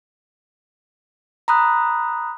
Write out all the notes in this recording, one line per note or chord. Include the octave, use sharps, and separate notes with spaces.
A#5 B5 D#6 F#6